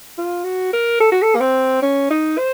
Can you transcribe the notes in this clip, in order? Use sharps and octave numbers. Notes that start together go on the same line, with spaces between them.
F4
F#4
A#4
A4
F#4
A4
A#3
C4
C#4
D#4
C5